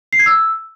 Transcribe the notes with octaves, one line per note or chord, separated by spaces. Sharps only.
C7
G#6
E6